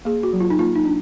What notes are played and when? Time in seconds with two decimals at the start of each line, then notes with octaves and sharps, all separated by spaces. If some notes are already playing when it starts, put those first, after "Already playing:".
0.05 A#3 G#4
0.23 F#4
0.33 F#3
0.40 F4
0.50 D#4
0.59 A#3 F4
0.75 D#4
0.85 D4